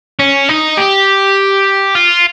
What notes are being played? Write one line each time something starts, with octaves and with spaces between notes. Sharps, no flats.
C#4
D#4
G4
F4